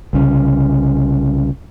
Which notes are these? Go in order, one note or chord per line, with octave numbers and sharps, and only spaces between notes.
C2 C#3